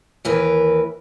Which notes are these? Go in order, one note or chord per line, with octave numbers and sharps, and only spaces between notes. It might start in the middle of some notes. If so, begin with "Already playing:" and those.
D#2 E3 A#4 B4